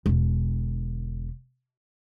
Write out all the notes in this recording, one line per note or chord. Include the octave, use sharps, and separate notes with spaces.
E1 D3